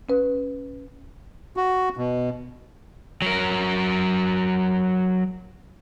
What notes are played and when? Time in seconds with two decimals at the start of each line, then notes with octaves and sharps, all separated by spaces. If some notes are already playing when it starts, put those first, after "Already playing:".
0.09 C#4 B4
1.57 F#4
1.97 B2
3.22 F#3 A#4